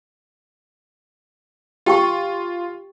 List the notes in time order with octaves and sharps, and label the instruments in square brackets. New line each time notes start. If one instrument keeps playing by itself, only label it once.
[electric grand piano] F4 [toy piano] G4 G5 C#6